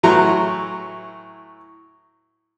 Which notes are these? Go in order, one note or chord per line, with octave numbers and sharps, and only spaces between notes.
A2 E3 F#3 E4 A#5 C6